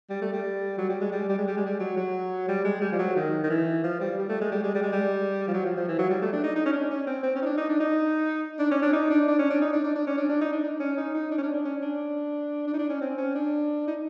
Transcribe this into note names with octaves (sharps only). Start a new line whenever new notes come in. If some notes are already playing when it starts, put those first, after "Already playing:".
G3
A3
G3
F#3
G3
G#3
G3
G3
G#3
G3
G#3
G3
F#3
F#3
G3
G#3
G3
F3
F#3
D#3
D#3
E3
F3
G3
G3
A3
G#3
G3
G#3
G3
G#3
G3
F3
F#3
F3
F3
E3
F#3
G3
A3
D4
D#4
D#4
C#4
D4
C#4
C4
C4
C#4
D#4
D4
D#4
D4
D#4
D4
C#4
D4
D#4
D4
D4
C#4
D4
D#4
D4
D4
D4
C#4
D4
D4
D#4
D4
D4
C#4
D#4
D#4
D4
C#4
D4
D4
C#4
D4
D4
D#4
D4
C#4
C4
C#4
D4
D#4